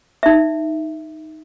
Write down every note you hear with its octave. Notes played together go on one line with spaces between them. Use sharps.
D#4 E5